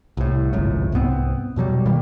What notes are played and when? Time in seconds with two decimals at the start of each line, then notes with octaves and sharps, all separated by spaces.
0.17 C2 A2
0.53 G#1 C#2 F#2 A2
0.92 C2 G#2 B3 C4
1.56 E2 B2 F#3 G3
1.86 B2 D#3 G3 A#3